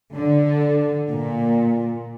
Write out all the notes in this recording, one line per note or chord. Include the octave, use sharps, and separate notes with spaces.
D3
A#2